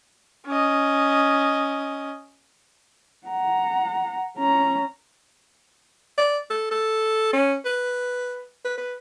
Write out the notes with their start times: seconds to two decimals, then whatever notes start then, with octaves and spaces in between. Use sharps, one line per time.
0.47 C#4 D#5
3.28 F#5 A#5
4.37 C#4 A#5
6.18 D5
6.50 A4
6.71 A4
7.33 C#4
7.65 B4
8.65 B4
8.78 B4